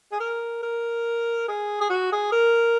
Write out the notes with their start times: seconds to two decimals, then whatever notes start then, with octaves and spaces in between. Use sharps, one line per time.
0.12 G#4
0.20 A#4
0.63 A#4
1.48 G#4
1.81 G#4
1.90 F#4
2.12 G#4
2.32 A#4